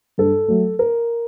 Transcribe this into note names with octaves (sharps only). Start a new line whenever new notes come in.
G2 A4
F#3 A3
A#4